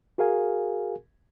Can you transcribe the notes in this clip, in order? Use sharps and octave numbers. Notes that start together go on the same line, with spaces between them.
F#4 G#4 A#4 F5 G#5